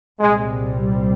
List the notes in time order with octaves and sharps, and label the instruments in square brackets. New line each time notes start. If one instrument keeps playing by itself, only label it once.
[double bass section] C2 A#2 G3 C4 [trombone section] G#3